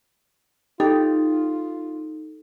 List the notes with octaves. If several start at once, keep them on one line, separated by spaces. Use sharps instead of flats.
D#4 F4 G4 A4